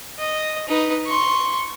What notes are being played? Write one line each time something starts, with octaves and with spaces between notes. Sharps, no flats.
D#5
D#4 B4
C6 C#6